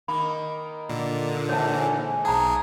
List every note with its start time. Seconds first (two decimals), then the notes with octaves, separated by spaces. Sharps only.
0.08 D#3 A#3 D#4 B5
0.89 A#2 D3
1.49 G#2 E3 C#5 A5
2.25 B1 G#4 A5 A#5